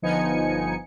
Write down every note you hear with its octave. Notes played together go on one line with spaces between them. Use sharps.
G1 F3 B3 D#4 G#5 C#7